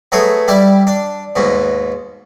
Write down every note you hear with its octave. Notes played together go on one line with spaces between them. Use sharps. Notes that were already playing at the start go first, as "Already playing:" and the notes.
F#3 A3 B3 G#4
G3 E4 D5
D4
D#2 G#2 B2